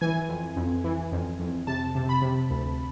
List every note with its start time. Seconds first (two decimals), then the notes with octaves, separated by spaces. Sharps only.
0.01 E3 G#5
0.29 F2
0.56 F2
0.84 E3
1.12 F2
1.40 F2
1.67 C3 A5
1.95 C3
2.09 B5
2.22 C3
2.50 D2